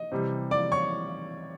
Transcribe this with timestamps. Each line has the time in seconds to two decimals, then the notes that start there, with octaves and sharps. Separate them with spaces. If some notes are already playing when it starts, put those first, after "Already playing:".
Already playing: D#5
0.12 C3 E3 G3
0.51 D5 D6
0.72 C#5 C#6